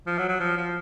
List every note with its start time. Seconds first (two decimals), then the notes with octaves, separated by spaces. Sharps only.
0.07 F3
0.18 F#3
0.29 F#3
0.40 F3
0.57 F3